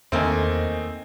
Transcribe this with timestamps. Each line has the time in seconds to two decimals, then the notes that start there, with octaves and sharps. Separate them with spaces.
0.12 E2 D#3 A3 A#3 C4 D#5 G#5